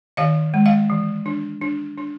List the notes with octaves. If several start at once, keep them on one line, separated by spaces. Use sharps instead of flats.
D#3 D#5 F5
G#3
D#5 F5
E3
D4
D4
D4